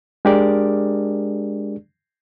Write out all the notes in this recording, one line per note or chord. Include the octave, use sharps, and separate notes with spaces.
G#3 D4 G4 G#4 A#4 D5